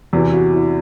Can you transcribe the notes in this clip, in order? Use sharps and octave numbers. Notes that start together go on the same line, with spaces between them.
E2 C3 E3 F#4
F#4
E4